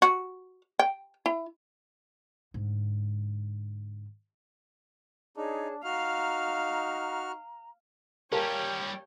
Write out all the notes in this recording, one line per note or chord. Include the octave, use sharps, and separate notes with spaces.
F#4
G5
E4
G#2 D3
D4 D#4 G#4 C#5 A5
D#4 F#4 F5 A#5 F6
G3 C#4 G4 A#4 C#5 F5 G5 A5